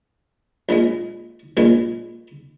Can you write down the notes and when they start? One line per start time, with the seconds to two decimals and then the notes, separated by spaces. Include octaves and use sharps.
0.69 A#1 A#2 G#3
1.57 A#1 A#2 G#3